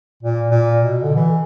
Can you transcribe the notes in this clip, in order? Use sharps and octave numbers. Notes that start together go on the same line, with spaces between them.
A#2
A#2
B2
D3
E3